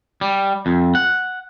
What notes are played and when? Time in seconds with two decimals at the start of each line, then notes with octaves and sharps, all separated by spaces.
0.21 G3
0.66 F2
0.95 F#5